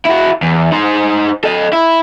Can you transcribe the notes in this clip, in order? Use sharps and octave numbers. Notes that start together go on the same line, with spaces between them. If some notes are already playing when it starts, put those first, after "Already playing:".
E4 F#4
E2
D#4 C5
A4 D#5
E4